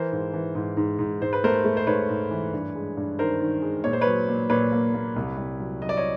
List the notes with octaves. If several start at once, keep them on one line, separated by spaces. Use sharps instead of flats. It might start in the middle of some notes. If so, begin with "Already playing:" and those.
Already playing: E3 A#4 C5
G#2
E3
G#2
G#2
G#2
G#2 C5
B4
A3 A#4 C5
A3
C5
G#2 B4 C#5
G#2
E3
G2
G#3
G2
D#3 A#4 C5
D#3
G#3
A#2 C#5
C5
B4 C#5
F#3
A#2
A#2 B4 C#5
A#3
A#3
C2
C2
F#3
F#3 D#5
D5
C#5 D#5